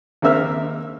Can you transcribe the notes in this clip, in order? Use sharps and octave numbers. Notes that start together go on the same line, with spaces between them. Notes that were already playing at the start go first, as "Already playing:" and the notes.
D#2 A#3 C4 E5 E6 F6